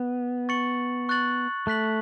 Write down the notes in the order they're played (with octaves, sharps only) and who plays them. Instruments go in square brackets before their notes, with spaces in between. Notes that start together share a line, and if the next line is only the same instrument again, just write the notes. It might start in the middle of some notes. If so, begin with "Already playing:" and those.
Already playing: [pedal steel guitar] B3
[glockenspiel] C#6 A6 C#7 F#7
C#6 F#6 A6 F#7
[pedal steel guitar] A3 [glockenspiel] F#6 B6 F#7